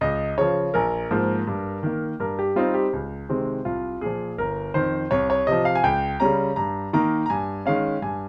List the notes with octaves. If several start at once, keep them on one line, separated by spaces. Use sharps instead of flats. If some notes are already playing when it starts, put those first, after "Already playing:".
C#2 D#5
C#3 F3 C#5
A#1 A#4
G#2 F3 A#3
G2
D#3 A#3
G2 A#4
G4
G3 C4 D#4 F4
G4
C#2
C3 D#3 G#3 C4
C2 F4
A#2 F3 G#4
G1 A#4
F2 D#3 C5
C2 C#5
C#5
C3 F3 D#5
F5
G#5
C#2 G5
C#3 G3 C#4 A#5
G2 A#5
D#3 A#3 D#4 A#5
A#5
G2 G#5
D#3 G#3 C#4 F5
G2 G#5